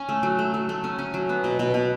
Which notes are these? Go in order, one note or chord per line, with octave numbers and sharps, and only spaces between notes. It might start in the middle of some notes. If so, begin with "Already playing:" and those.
Already playing: C#4
A3
F#3
A3
F#3
A3
C#4
C#4
F#3
B3
B2
B2
B2